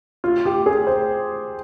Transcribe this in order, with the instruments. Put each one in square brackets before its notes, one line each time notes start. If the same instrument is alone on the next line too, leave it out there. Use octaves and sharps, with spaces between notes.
[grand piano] F4
G4
G#4
C5